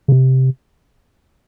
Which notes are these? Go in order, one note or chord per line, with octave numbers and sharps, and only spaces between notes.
C#3
C3